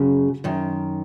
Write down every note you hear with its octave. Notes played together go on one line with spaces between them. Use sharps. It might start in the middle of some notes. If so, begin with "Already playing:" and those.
Already playing: F#2 C#3
F#2 D#3